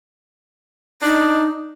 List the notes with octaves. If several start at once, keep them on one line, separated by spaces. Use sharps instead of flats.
D4 D#4